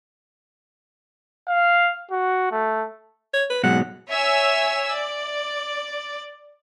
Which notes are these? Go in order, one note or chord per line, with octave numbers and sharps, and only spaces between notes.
F5
F#4
A3
C#5
B4
G#2 B2 F#3 F#5
C#5 E5 G#5 E6
D5